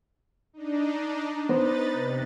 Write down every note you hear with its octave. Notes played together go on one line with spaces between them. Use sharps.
D4 D#4
B3 D#4 B4 C5 A6
C3